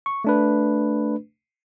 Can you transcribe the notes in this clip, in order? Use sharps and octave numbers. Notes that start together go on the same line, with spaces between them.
C#6
A3 D4 B4